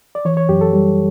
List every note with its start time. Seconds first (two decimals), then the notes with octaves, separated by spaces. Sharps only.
0.15 D5
0.25 E3 C#5
0.37 C#5
0.49 F#2 G4
0.61 A4
0.73 G3